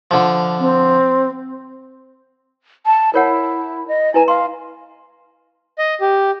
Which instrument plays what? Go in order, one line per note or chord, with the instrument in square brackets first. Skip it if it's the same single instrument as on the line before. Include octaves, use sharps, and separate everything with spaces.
[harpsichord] D3 F3
[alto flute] C4
[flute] A5
[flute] E4 [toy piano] A#4 C#5 F#5
[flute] D#5
[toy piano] E4 B4 A#5 [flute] G#5
[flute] F5 [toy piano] C6
[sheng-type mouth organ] D#5
G4